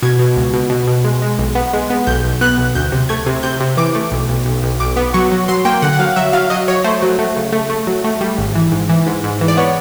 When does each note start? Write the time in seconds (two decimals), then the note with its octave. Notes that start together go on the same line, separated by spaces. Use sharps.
0.03 B2 G#6
0.19 B2
0.36 C#2
0.54 B2
0.70 B2
0.87 B2
1.04 G#3
1.22 G#3
1.39 B1
1.55 B3
1.73 G#3
1.90 B3
2.07 B1 G6
2.24 B1
2.41 B3 F#6
2.58 B1
2.75 D2 G6
2.92 C3
3.09 A3 G#6
3.26 C3
3.43 C3 G6
3.60 C3
3.77 E3 D6
3.95 A3
4.12 B1
4.29 B1
4.46 B1
4.63 B1
4.80 B1 D6
4.97 B3
5.14 F#3 C#6
5.32 F#3
5.48 F#3 C6
5.65 A#3 G5
5.82 D3 F#5
5.93 F#5
5.99 F#3 F5
6.16 F#3 E5
6.33 F#3 F5
6.50 F#3 D#5
6.68 F#3 C#5
6.84 A3 C5
7.02 F#3
7.19 A3
7.36 C#3
7.53 A3
7.70 A3
7.87 F#3
8.04 A3
8.21 G3
8.38 G#1
8.55 E3
8.72 G#2
8.89 E3
9.06 G#2
9.24 G#2
9.41 E3
9.48 D5
9.57 B3 C#5